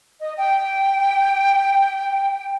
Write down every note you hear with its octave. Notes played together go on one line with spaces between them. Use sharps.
D#5
G5